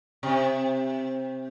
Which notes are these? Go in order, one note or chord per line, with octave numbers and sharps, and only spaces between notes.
C3